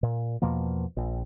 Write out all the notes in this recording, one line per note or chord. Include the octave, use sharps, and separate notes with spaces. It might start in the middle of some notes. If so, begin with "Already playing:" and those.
A#2
E2 B2 F3 A#3
A#1